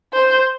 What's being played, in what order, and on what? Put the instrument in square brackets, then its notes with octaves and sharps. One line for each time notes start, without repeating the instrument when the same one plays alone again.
[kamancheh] C5